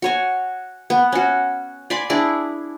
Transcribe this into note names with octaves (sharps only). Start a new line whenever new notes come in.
F#4 C#5 G#5
B3
C#4 F#4
D5 G#5 B5 C6
D4 E4 G#4 D5